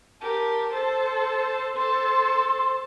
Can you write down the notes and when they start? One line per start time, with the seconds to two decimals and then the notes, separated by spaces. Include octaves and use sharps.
0.21 G4 A#4 A5
0.73 A4 C5
1.76 A4 C5 C6